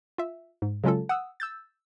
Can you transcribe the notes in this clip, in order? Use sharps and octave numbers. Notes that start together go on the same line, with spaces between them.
F4 E5
G#2
C#3 F#3 G#3 C#4 F4 A4
F#5 D#6 E6
E6 G6 A6